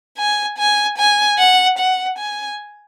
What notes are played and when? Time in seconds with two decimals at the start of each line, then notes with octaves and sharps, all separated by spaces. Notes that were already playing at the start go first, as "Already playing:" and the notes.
0.18 G#5
0.58 G#5
0.98 G#5
1.38 F#5
1.79 F#5
2.19 G#5